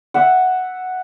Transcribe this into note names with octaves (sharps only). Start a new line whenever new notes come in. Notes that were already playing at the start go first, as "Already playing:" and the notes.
E5 F#5